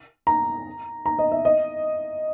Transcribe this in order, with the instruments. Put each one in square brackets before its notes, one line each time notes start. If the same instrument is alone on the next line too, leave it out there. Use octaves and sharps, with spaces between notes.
[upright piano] A#5
A#5
D#5
E5
D#5